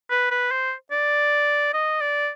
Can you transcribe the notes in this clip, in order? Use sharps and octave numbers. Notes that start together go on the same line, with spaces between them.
B4
B4
C5
D5
D#5
D5